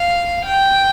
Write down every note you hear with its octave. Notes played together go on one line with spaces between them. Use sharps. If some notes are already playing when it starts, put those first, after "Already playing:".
Already playing: F5
G5